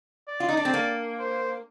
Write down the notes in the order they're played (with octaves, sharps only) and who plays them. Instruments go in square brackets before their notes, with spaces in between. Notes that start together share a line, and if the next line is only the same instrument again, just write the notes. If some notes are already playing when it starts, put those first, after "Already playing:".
[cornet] D5
[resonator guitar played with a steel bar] F4
D#4
D4
C4
A#3
[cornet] C5